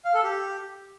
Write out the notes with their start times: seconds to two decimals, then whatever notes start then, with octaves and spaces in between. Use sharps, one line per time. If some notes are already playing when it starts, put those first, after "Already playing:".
0.05 F5
0.14 A4
0.24 G4